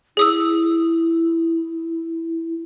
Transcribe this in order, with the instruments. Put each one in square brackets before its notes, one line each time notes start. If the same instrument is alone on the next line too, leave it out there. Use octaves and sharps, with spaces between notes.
[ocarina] E4 [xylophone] G#4 D#6 E6